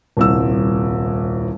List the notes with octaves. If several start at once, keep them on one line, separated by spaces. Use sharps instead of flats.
D#1 C2 E6